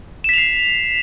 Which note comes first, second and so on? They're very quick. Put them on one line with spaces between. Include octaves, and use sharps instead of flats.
E7 B6 F7 C7